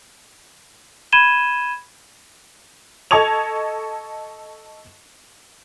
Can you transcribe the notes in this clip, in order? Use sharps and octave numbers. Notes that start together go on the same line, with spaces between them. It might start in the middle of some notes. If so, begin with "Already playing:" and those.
B5 G#6 D#7 E7 G7
A4 D#5 A5 C#6 G#6 F7